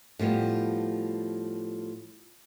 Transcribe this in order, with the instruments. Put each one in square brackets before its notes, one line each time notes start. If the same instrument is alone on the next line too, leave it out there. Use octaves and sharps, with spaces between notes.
[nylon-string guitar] A2 F3 G3 B3